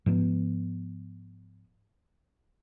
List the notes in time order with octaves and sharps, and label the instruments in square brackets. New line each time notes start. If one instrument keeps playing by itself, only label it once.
[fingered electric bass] G#2 F3 B3